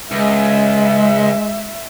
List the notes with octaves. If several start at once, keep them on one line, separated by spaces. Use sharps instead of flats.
C#2 G#3 E5